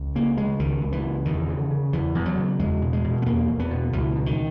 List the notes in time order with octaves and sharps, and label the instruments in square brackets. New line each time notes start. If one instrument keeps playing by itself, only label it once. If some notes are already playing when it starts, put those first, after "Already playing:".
Already playing: [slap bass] C#2
C#3 A#3
C#3 G#3
C#2 D#3
C#2
E3
C#3
E2 D#3
C#3
C#3
E2 E3
E2
F#3
C#3
E2 G#3
B2
G#3
B2
B3
E2 A#3
E2
B3
B2
C#2 E3
B2
D#3